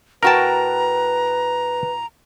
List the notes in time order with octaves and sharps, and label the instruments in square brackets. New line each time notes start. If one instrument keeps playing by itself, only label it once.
[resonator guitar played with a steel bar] A2 F#4 G5 [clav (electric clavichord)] A#4 A5 [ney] B4 [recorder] A#5